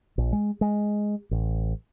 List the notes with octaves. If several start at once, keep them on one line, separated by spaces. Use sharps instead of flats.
A#1
G#3
G#3
A1